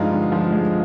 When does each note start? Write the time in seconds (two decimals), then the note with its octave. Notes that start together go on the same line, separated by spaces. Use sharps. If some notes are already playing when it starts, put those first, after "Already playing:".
Already playing: G2 F3 G#3 D#4 F4
0.11 D3
0.32 F3
0.52 G#3